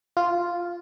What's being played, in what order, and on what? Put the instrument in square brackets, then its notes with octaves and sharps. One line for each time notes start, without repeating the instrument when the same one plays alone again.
[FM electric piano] F4